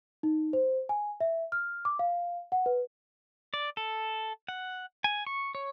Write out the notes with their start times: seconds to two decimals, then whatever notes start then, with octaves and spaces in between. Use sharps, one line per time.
0.23 D#4
0.53 C5
0.89 G#5
1.20 E5
1.52 F6
1.85 D6
1.99 F5
2.52 F#5
2.66 B4
3.54 D5
3.77 A4
4.48 F#5
5.04 G#5
5.27 C#6
5.55 C#5